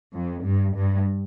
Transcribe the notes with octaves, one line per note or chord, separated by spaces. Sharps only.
F2
G2
G2